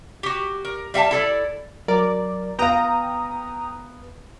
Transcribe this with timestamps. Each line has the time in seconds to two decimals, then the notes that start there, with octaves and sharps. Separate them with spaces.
0.23 F#4 G4
0.65 A#4
0.94 G3 E5 F5 A5
1.11 E4 A4 D5
1.88 F#3 A#4 D5
2.59 B3 F5 G5 A#5 D#6